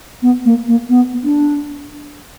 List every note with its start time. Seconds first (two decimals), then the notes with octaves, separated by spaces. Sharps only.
0.22 B3
0.45 A#3
0.68 A#3
0.89 B3
1.24 D4